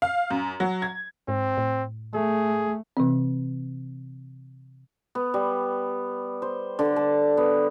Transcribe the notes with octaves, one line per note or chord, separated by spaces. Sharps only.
F5
F#2
F#3
G#6
G#2 C4
A2
A3 G#4
C3 E3 C4
B3
G3
C5
D3
A5
B3